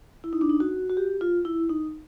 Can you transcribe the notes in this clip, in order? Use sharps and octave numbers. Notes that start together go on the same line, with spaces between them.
E4
D#4
D4
D#4
F#4
F#4
G4
F4
E4
D#4